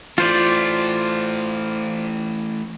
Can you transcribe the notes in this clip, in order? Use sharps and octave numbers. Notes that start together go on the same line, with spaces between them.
E3 A3 F4 C5 D5